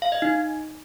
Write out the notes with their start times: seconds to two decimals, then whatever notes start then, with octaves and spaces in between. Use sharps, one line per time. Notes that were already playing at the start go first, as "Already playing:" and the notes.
0.02 F5
0.12 D#5
0.22 D#4